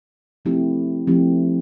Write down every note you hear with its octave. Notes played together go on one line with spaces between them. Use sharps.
F3 A3 C4 E4 G4
F3 A3 C4 E4 G4